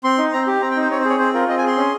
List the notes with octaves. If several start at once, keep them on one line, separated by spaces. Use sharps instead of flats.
C4 C6
D#4
C4 A#5
G4
C4 A#5
G5
D#4
C5
C4 C#5
C5
G#4 C#5
C4 C5
F4 A#4
C4 D#5
G#5
G#4 C6
C#4